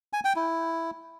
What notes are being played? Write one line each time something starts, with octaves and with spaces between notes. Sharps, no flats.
G#5
G5
E4